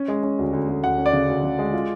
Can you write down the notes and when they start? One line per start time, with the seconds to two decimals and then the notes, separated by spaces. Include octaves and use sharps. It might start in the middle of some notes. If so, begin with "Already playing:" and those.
Already playing: C#4
0.08 G#3
0.23 C#4
0.39 D2
0.53 D2
0.69 D2
0.84 D2 F#5
0.98 C#4
1.06 D5
1.13 C#3
1.28 D2
1.43 C#3
1.59 G#3
1.74 F4